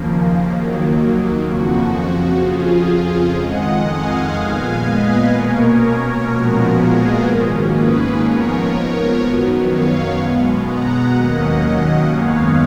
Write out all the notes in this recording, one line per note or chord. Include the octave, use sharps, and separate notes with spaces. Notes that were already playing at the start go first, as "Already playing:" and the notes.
Already playing: D#2 C#3 F3 A#3
D#2 D#3 F#3 A#3
F2 C#3 F3 F#4
F2 C#3 F3 F4 G#4
F2 D#3 G#3 D#5 F#5
F5 G#5
A#2 G#3 B3 F5 G#5
B4 D#5
B2 A#3 C#4 A#4 C#5
A#2 F3 G#3 B3 F#4 A#4
F4 G#4
G#2 D#3 A#3 C#4
G#4 B4
G#2 F3 B3 A#4 C#5
F#2 D#3 F#3 B3
C#5 F5
B2 G#3 B3
F#5 A#5
D#2 D#3 F#3 A#3 C#4 D#5 F#5
F#2 D#3 G#3 B3 C#5 F5